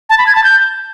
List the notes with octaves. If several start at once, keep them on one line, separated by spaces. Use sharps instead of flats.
A5
B5
G#6
A5
G6